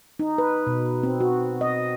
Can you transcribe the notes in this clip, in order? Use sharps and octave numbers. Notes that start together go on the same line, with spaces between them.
D#4
B4
B2
C4
F#4
D#5